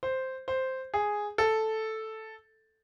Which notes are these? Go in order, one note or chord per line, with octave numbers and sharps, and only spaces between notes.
C5
C5
G#4
A4